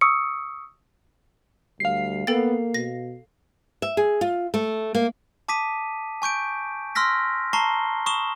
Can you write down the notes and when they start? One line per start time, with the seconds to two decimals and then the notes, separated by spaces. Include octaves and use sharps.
0.01 C#6 D#6 E6 C#7
1.80 D2 G3 F5 C7
2.27 A#3 B3 A4 G5 A6
2.74 B2 A#6
3.82 E5
3.97 G#4
4.21 F4
4.54 A3
4.95 A#3
5.48 A5 D6 D#6 B6 D#7
6.22 G#5 C#6 G6 D7
6.95 C6 E6 F6 A#6 B6
7.53 A5 A#5 C#6 C7 G7
8.06 B5 C#6 D#6 E7 G7